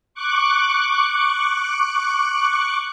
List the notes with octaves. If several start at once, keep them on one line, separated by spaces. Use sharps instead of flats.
C#6 D6 F#6